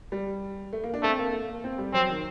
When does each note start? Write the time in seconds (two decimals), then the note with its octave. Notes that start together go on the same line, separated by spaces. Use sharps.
0.12 G3
0.73 A3
0.84 A#3
0.94 D4
1.03 A3 C4
1.19 A#3
1.33 A3
1.48 A#3
1.64 C4
1.78 G3
1.93 F#3 C4
2.09 D#3